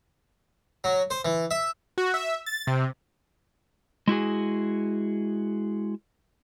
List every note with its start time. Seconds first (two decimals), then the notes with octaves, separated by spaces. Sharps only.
0.84 F#3
1.11 C5
1.25 E3
1.51 E5
1.98 F#4
2.14 E5
2.46 A6
2.67 C3
4.07 G#3 E4 F#4 G#4